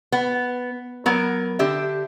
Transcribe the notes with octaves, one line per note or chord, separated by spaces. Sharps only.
B3
F#3 B3 A#4
D3 G4 E5